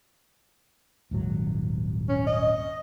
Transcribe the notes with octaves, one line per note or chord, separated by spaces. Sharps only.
D#1 G#1 F#3
C#4
D#5